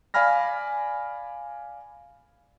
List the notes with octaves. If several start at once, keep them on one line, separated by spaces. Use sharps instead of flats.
D5 F5 G#5 B5 F6 A#6